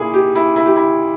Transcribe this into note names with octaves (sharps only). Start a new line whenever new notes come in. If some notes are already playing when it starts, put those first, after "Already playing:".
Already playing: A#2 A#3 E4 G#4
G4
E4
E4
G4
E4